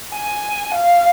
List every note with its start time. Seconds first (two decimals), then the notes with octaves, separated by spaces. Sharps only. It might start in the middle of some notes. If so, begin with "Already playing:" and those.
0.13 G#5
0.75 F5